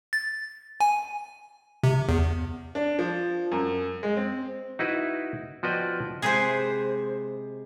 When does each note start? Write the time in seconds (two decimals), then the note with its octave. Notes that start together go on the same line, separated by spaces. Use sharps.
0.13 A6
0.81 G#5
1.83 C3
2.09 E2
2.75 D4
2.99 F3
3.52 F#2
4.03 G#3
4.17 C4
4.79 D#4 E4 F#4 B4
5.63 F3 F#4 B4 D5 D#5 G5
6.22 C3 G#3 G#4 B4 C5